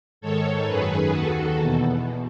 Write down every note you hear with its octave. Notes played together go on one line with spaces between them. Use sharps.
G#2 D#3 A4 C#5
F#2 D#3 G#4 B4
D#2 D#3 F#4 A4
E2 B2